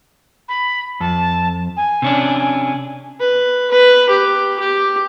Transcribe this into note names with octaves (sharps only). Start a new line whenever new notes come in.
B5
F2 A5
G#5
C3 C#4 D4
B4
B4
G4
G4